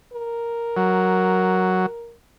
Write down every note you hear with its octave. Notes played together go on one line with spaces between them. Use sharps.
A#4
F#3